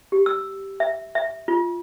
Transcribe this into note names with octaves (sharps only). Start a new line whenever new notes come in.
G4
E6
E5
E5
F4